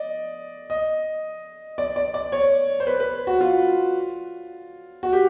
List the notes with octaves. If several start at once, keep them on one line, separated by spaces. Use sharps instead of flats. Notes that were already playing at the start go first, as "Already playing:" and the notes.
Already playing: D5 D#5
D#5
D5
D5
D5
C#5
C5
B4
B4
F#4
F4
F#4
G4